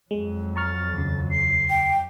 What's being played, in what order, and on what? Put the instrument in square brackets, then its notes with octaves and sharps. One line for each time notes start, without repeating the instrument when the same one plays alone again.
[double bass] F2 F#3 [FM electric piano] G#3
[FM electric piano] A#5 C#6 F6 [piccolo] A6
[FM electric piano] D#2 C#3
[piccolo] C7
[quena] G5